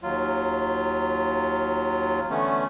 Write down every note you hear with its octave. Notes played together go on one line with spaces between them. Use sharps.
D#2 F#3 F4
D3 E3 A3 B3 C#4